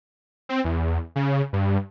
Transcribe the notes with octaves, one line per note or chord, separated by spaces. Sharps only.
C4
E2
C#3
G2